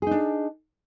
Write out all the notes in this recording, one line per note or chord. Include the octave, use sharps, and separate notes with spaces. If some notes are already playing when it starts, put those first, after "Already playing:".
D4 D#4 G#4